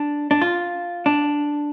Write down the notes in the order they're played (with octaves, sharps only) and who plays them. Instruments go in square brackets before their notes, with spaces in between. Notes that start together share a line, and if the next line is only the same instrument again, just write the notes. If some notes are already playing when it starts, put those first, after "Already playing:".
Already playing: [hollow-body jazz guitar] D4
D4
F4
D4